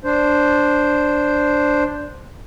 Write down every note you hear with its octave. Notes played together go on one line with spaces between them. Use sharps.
D4 C5